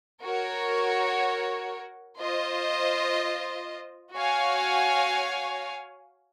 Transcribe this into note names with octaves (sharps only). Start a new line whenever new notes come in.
F#4 A#4 C#5
F4 C5 D#5
F#4 C#5 F5 G#5